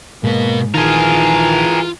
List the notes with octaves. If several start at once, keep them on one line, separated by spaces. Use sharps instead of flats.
G#2 B2 A#3 B4
A#1 D#3 E3 F4 G#4 A#4